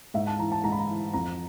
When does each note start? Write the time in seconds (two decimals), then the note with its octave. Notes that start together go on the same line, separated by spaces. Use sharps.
0.14 G#2 E5
0.27 A5
0.39 E3 A#5
0.52 A5
0.64 G#2 A#5
0.72 B5
0.79 A#5
0.89 E3
1.13 F2 A#5